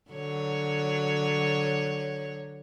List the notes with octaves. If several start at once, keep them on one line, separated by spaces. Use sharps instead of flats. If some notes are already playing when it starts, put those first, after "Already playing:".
D3 F#3 C#5